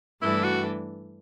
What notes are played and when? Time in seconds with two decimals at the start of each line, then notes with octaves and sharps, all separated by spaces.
0.22 G2 E3 A3 D4 E4 A4
0.44 F#4